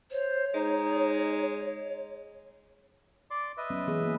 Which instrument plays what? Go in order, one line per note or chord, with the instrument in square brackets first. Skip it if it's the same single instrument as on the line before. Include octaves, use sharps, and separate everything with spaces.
[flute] C5 [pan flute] C#5
[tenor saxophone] G#3 [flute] D#4
[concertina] D5 C6 D6
B4 D#5 E5
[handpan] F#3 B3 C#4
E3 B3 G#4
A#3